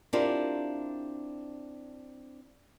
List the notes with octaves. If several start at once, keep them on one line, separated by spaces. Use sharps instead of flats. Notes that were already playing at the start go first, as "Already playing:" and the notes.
C4 D4 E4 F4 G4 A#4